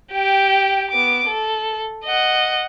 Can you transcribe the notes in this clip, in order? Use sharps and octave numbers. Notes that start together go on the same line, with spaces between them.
G4 G5
B3 D6
A4
D#5 F#5